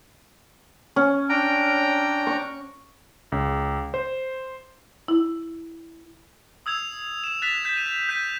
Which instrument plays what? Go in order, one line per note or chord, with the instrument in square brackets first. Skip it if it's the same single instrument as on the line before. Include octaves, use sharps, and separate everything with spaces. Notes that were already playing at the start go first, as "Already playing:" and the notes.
[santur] C#4
[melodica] D4 G5 A#5
[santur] C#6
[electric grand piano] C#2
C5
[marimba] E4
[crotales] D#6 E6 G#6 F7
E7 F7
F#6 A6 B6 E7 F7
G6 B6 E7
D#7 E7
G6 B6 D#7